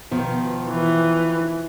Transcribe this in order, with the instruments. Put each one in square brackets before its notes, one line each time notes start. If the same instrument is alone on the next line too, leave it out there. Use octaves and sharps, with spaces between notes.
[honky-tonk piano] B2 [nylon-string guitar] D#3 F3
[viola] E3